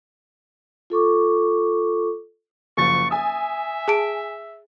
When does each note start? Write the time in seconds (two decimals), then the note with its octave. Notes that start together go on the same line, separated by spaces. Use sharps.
0.90 F4 A4 C#6 D6
2.77 F#1 F3 C#6 A6
3.11 E5 G#5 D#6
3.88 G#4 A5 D7